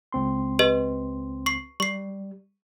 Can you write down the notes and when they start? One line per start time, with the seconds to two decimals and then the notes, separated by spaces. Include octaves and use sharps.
0.12 C#2 C4 C6
0.59 G4 B4 D#5
1.46 C#6 C7
1.80 G3 C#6 C7